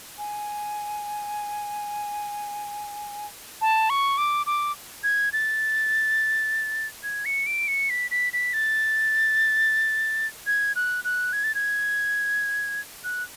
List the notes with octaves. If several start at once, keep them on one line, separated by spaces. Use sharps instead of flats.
G#5
A5
C#6
D6
D6
G#6
A6
G#6
C#7
D7
C#7
B6
B6
B6
A6
G#6
F#6
F#6
G#6
A6
G#6
F#6